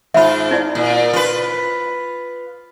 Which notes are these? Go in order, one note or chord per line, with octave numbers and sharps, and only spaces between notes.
G#2 F4 E5 B5
D#4 E4 D5
A#2
F4 B4